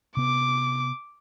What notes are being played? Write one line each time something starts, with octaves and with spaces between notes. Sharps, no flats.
C3 B3 D6